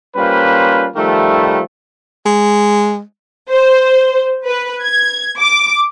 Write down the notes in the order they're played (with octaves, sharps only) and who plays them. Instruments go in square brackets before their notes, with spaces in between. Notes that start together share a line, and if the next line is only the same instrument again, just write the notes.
[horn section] G3 A#3 C#4 F4 B4 C5
D#3 F3 G3 A3
[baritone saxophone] G#3
[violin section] C5
B4
G#6
D6